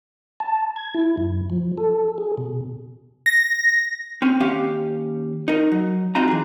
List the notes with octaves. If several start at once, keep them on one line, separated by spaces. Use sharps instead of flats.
A5
G#6
E4
F#2
F3
A4
G#4
B2
A#6
C4 C#4
D#2 C#4 G4 F5
D#4 A#4
F#3
C4 D#4 F4 F#4 A#5
E3 G#4